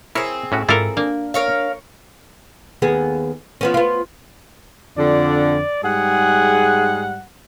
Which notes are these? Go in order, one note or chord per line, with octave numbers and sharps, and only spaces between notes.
C4 E4 G#4 A#4 C#5
A2 C#4 F#4
G#2 E4 F4 A4 A#4 D5
A#3 D4
A#4 C#5 F5
D#2 B3 G#4
F3 B3 C#4
B3 F4
F2 D3 D5
G#2 G3 G#4 F#5